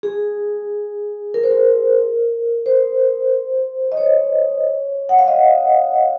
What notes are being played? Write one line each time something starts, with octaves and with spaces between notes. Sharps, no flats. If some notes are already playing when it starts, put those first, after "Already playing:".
G#4
A#4
C5
A#4
C5
D#5
C#5
F#5
F5
D#5